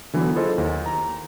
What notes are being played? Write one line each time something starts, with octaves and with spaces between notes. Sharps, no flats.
D3 E3 F#3 B3
E4 F4 G#4 A4 C5 D#5
D#2
A#5